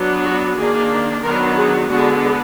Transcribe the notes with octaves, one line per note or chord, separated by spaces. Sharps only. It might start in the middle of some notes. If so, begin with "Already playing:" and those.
Already playing: F#3 B3 D4
F#4
D#3 A#3 D4 G#4
D#3 F#3 B3 D4 A#4
G#4
D3 G#3 B3 D4 F#4